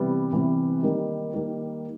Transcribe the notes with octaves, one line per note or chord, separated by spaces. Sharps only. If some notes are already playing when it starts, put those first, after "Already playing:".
Already playing: C3 E3 G3 B3
C3 E3 G3 B3
D#3 G3 A#3 D#4
D#3 G3 A#3 D#4